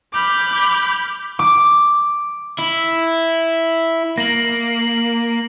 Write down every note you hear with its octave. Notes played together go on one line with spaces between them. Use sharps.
B5 D6 F6 G6
D6
E4
A#3 A#6 F#7